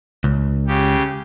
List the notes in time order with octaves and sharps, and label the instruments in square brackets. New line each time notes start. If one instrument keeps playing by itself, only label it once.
[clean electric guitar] C#2
[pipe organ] C#3 G4